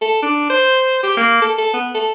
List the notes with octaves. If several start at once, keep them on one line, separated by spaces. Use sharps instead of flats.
A4
D4
C5
G4
A#3
A4
A4
B3
A4